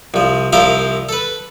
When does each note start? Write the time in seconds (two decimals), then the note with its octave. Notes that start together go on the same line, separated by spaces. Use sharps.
0.14 C2 F3
0.53 C2 F3 A#4 C5 E5 F5
1.09 A4 B4